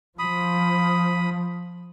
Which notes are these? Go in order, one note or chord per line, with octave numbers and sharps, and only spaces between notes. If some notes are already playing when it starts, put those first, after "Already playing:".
F3 B5 D#6